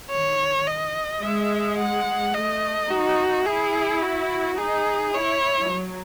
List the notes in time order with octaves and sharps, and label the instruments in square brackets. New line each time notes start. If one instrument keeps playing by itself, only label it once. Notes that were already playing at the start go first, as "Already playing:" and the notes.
[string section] D#3 [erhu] C#5
[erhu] D#5
[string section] G#3 [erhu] E5
[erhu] F#5
[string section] A3 [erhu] D#5
[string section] D#4 [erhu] F#4
[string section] E4 [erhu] G#4
[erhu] F#4
[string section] D#4 [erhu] G#4
[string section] E4 [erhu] C#5
[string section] F#3